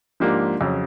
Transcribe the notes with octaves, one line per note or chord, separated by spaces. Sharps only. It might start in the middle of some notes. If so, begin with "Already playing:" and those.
G#2 F3 A#3 D4 G4
F2 C#3 F#3